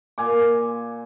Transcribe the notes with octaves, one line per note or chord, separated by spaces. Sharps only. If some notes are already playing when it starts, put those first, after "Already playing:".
A#2 G#5 D6